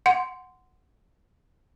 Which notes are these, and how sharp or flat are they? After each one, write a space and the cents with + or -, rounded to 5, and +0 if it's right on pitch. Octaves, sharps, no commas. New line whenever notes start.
F#5 +0 C6 -15